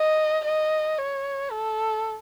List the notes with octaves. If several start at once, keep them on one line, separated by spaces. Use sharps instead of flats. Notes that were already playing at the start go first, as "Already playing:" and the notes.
Already playing: D#5
D#5
C#5
A4